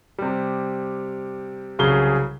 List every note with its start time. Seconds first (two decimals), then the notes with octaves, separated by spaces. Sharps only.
0.19 C3 G3
1.79 C2 C#3 F#3 G#4 G7